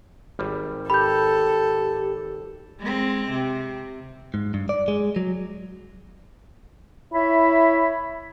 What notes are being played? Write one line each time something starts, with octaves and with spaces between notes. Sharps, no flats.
G#1 G3
G4 A4 B5 G6
G#3 C4
C3
G#2
G2
D5
G#3
F#3
E4 C#5 E5 B5